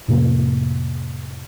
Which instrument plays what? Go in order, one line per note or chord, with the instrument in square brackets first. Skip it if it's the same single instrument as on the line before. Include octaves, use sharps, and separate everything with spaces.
[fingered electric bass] F2 A2 C3 A#3